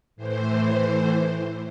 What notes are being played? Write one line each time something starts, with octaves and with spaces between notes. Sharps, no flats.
A2 E3 C5